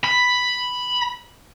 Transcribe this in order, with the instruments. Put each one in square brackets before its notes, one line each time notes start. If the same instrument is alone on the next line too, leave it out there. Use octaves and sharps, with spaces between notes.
[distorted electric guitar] B5